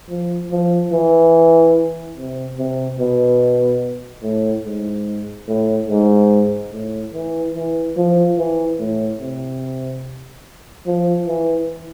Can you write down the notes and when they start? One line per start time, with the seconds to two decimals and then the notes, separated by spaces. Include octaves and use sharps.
0.10 F3
0.51 F3
0.92 E3
2.17 C3
2.58 C3
2.99 B2
4.23 A2
4.65 G#2
5.48 A2
5.89 G#2
6.72 A2
7.14 E3
7.54 E3
7.97 F3
8.38 E3
8.79 A2
9.20 C3
10.86 F3
11.27 E3